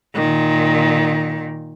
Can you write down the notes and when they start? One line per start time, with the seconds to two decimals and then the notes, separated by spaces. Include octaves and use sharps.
0.15 A#2 D#3